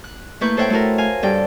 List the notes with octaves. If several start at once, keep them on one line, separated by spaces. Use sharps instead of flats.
F#6
A3 A#3 E4 B4 C#6 G6
A4 C5 C#5 E5 F#5 G5
A3 E4 F#4 A4 A#4
F5 G#5
G2 A4 G5